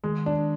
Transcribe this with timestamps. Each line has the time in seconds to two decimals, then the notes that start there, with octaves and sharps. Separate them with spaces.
0.04 D#3 G#3
0.26 D4